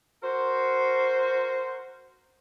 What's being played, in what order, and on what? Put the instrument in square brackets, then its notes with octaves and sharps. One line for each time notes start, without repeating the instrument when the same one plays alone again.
[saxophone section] F#4 A#4 C5